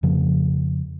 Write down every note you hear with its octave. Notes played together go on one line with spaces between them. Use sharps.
F2 C#3 F3